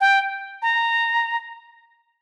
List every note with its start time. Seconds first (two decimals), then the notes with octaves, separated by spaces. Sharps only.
0.01 G5
0.62 A#5